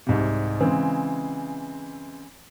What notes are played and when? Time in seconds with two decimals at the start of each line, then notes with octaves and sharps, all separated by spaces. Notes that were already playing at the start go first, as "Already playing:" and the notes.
0.07 C2 G#2 C3
0.60 C#3 E3 G#3 C4